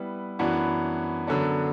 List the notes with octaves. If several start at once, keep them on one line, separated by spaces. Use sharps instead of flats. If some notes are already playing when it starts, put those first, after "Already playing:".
Already playing: G3 B3 E4 B4
F#2 E3 B3 D4 F#4
F#2 D3 F#3 B3 D4